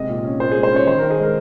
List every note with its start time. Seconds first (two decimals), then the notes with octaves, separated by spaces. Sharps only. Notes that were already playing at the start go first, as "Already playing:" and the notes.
Already playing: C3 G#3 D#5
0.08 A#2
0.24 C#4
0.40 A#2 C5
0.51 G#3 G#4
0.63 C5
0.72 C#4 C#5
0.87 D#3 C5
0.99 D#3 A#4
1.11 G#4
1.18 G#3 A#4